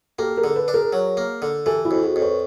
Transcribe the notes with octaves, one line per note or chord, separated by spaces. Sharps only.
A#3 G4 A4
G#4 A#4
D3
A4 B4
D4
G#4 A#4
F#3
A#3
D3
E3 G4 A4
E4 F#4
F2
F#4 G#4
F2
B4 C#5